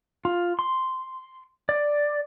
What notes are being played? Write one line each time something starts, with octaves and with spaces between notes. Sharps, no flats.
F4
C6
D5